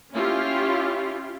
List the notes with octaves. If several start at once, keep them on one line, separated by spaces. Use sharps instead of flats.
C#4 E4 F4 G4